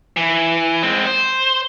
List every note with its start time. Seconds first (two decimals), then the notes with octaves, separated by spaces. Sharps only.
0.17 E3
0.83 G#3 C4
1.07 C5